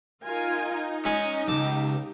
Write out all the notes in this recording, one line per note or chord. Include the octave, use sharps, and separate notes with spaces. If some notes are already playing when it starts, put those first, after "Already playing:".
D#4 F4 A#4 G#5
G#3 C#4 D#5 G#5 C#6
C#2 F#2 G4 A5 D6